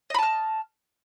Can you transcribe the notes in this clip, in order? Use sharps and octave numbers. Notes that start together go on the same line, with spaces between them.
D#5 A5 B5 F6